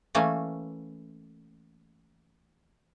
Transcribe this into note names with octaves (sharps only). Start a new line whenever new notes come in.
E3 A3 A#3 C#4